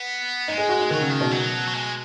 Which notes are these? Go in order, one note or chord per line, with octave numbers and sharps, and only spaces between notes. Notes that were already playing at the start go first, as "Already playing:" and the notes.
Already playing: B3
G#3 D#4
G#4
F#4
D#4
D#3 F#3
C#3
D#3
B2
F#3
F#3
G#3